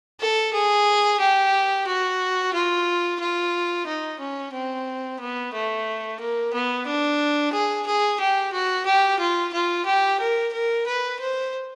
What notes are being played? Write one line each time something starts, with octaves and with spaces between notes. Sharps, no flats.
A4
G#4
G4
F#4
F4
F4
D#4
C#4
C4
B3
A3
A#3
B3
D4
G#4
G#4
G4
F#4
G4
F4
F4
G4
A#4
A#4
B4
C5